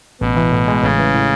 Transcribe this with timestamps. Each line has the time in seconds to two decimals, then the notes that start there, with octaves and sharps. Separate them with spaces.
0.21 A1 B2
0.37 E3
0.52 A2
0.68 G#3
0.83 A1 C#3
0.99 E3
1.14 A2